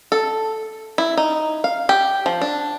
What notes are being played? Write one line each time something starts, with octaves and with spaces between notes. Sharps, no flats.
A4
E4
D#4
F5
G4
F3
D4